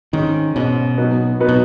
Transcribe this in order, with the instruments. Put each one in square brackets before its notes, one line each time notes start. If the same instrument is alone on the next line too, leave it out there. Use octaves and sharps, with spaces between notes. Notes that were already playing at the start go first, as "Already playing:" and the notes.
[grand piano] G#2 G#3 C#4 [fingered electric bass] D#3
[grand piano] G#2 G#3 C#4 [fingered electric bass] B2
[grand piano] F#3 B3 D#4 B4
F#3 B3 D#4 B4
[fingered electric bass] B2